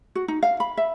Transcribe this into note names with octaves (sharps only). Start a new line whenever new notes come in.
F#4
D#4
F5
B5
E5